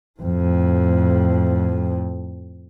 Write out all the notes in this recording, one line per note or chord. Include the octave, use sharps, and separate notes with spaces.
F2 A2